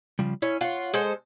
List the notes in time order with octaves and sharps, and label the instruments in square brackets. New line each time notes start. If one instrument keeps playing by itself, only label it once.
[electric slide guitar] C#3 F3 G3
[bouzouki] C#4 [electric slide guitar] E4
[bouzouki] F4 [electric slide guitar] C#5 F#5
[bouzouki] G#3 A4 C5